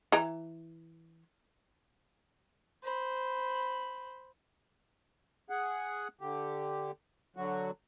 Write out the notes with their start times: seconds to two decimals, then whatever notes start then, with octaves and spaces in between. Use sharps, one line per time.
0.12 E3 A#5
2.84 C5 B5
5.50 G#4 F#5
6.21 D3 G4
7.36 D3 F#3 F#4